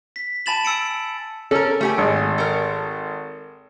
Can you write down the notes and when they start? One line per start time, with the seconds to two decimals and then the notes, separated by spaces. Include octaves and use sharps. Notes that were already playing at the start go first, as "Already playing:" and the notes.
0.16 B6
0.46 G#5 A5 B5 A6 E7 F#7
0.65 G#5 E6 C#7 D7
1.51 C#4 A4 A#4
1.81 A3 G4 G#5
1.98 G#1
2.38 A4 A#4